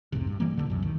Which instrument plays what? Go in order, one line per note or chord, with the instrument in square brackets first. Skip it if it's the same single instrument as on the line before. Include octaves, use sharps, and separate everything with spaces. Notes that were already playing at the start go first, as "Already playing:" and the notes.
[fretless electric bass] F1 C2 A2 C3
G2
E3 G3 A#3
D#1 C#2 D3
C2 F#2
D1 D#3